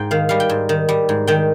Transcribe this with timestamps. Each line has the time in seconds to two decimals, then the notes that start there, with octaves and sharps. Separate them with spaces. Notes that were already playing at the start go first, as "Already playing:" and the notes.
Already playing: G#2 G5
0.11 D#3 F5
0.29 G3 F5
0.40 G5
0.49 G#2
0.69 D#3
0.89 G3
1.09 G#2
1.27 D#3 G5